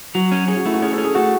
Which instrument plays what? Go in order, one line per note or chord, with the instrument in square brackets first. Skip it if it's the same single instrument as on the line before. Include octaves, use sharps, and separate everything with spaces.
[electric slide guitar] F#3 [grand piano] F#4
[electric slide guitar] C#4
[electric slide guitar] C#4 [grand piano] G#4
[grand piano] F#4
[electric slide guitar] A3 [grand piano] E4
[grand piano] F#4
[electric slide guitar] C#4 [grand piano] G#4
[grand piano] A4
[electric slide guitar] C#4
[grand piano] G#4
[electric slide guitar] A3 [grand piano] F#4